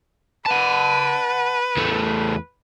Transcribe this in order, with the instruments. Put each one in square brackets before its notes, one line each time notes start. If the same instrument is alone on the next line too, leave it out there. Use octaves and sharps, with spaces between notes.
[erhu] B4 [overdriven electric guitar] F#5 A5
[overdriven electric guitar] E2 A3